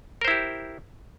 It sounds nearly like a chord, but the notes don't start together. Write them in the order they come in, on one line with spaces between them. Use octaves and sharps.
A#4 C5 E4 G4